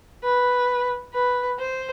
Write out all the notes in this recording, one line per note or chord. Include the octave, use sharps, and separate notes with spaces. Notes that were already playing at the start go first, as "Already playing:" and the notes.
B4
B4
C5